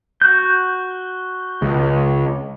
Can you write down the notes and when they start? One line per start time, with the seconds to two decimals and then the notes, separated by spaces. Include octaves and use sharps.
0.22 F#4 G6
1.62 C#2